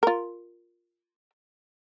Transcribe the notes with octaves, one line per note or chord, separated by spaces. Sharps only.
F4 A#4